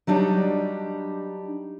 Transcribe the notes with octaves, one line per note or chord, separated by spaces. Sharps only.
F#3 G3 D4 D#4